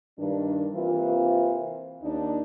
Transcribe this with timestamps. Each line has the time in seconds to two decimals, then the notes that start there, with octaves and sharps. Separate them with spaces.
0.19 G2 D#3 D4
0.74 C3 E3 A#3 C4 F4
2.03 D#2 D4 D#4